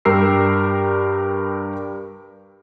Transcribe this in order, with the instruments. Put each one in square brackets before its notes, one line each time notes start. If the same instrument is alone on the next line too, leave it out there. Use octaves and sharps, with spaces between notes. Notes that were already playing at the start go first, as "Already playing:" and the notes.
[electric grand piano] G2 G3 G4 A#4 E6 C7